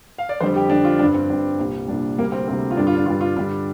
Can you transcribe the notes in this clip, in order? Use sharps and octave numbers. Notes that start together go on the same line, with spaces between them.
F5
D5
F2 D3 G3 C5
G4
F2 D3 G3 D4
F4
G2 G3 D4
C4
G2 G3 D4
C2 A#2 G3
C2 A#2 G3 D4
D2 C3 G3 A#3
C4
D2 C3 G3 C4
F4
G2 D3 G3 D4
F4
D4
G2 D3 G3 F4
F4
G2 D3 G3 D4